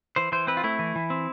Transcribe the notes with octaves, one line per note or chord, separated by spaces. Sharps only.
E3 C5
E3 C5
C4 B4
F4
A3 E4
E3
E3
C4